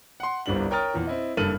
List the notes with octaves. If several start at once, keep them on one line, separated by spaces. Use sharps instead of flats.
F#5 C6
G1 C2 C3 G3 D4 F#7
A#4 C#5 G5 D#6 F6 A6
E2 A#2
C4 E4 D#5
F#1 G2 A4 F6 D#7 F#7